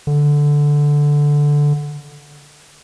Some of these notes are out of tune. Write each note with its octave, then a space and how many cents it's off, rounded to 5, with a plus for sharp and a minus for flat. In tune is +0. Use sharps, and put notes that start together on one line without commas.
D3 -5